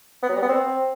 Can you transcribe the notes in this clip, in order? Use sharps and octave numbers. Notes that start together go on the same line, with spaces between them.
B3
F#3
G3
B3
C4